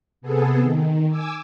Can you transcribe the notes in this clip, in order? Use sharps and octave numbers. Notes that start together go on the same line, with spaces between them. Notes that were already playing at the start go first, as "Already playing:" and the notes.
C3 B3 G#4 A4
D#3
G#5 D6 E6